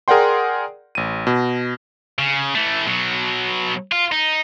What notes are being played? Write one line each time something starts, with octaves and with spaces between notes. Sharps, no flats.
G#4 A#4 D5 F#5 G5 C6
A1 D#7
B2
C#3
E3 A3
B2 F#3
F4
D#4